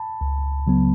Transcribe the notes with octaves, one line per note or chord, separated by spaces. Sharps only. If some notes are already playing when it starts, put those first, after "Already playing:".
Already playing: A5 B5
C#2
C#3 F#3 B3